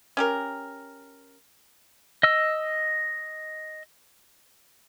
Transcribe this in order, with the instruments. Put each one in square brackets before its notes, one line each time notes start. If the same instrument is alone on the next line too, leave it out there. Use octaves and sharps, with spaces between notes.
[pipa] C#4 G4 A#4
[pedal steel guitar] D#5 E6